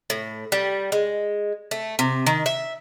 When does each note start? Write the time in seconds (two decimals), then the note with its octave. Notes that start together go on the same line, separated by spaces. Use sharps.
0.10 A2
0.52 G3
0.92 G#3
1.71 A3
1.99 C3
2.27 D#3
2.46 E5